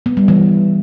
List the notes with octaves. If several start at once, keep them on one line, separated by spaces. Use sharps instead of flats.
B3
G3
E3